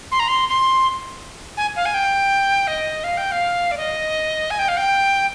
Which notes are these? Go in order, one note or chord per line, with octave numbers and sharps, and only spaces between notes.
C6
A#5
C6
C6
G#5
F5
G#5
G5
D#5
F5
G5
F5
D5
D#5
G#5
G5
F5
G5